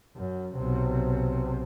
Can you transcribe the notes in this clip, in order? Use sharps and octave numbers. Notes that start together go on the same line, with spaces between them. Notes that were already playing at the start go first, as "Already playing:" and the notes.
F#2
B1 C3